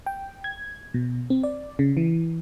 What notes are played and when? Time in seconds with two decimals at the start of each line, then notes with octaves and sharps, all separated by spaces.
0.06 G5
0.44 G#6
0.94 B2
1.30 C4
1.43 D5
1.79 C#3
1.97 E3